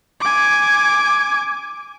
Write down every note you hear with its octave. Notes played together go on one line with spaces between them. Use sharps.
G#5 D6